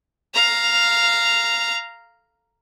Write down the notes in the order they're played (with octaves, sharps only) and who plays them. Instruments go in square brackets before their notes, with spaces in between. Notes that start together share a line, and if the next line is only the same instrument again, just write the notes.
[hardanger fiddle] F5 A#5